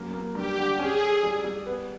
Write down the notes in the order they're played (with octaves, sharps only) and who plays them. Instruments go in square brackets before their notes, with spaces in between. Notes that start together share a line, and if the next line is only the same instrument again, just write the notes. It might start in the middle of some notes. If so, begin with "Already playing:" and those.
Already playing: [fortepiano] F#2 A#3
A#3
[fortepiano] G2 [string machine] G4
[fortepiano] D3
[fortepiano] C#4 [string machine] G#4
[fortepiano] A4
G3
G3
B3